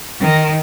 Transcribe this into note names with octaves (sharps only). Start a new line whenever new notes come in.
D#3